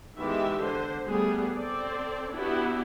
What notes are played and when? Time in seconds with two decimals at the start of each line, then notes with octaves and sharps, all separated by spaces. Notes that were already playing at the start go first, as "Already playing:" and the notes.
0.18 D#3 E3 G#3 B3 G4 E5
0.58 D3 C5
1.06 G3 A3 B3 G#4
1.53 C4 A4 D5
2.31 B3 D4 E4 F#4 G4